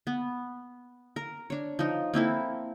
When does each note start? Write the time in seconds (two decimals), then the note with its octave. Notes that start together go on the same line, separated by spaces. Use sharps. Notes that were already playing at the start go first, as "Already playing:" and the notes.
0.07 B3
1.16 A#4
1.50 D4 C#5
1.79 F3 D#4
2.14 A#3 C4 E4 A4